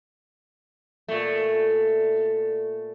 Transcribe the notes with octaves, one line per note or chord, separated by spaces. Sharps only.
A#2 A3